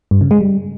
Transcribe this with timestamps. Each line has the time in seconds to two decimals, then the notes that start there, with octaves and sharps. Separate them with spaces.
0.11 G2
0.21 C#3
0.31 G#3
0.41 G3